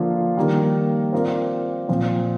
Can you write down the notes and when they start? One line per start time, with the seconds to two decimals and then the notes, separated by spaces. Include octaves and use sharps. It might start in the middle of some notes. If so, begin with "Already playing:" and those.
Already playing: D3 F3 A#3 F4 C5
0.37 D#3 G3 A#3
1.12 C4 F4 A#4 D5
1.88 A#2 F3 C4 F4 C5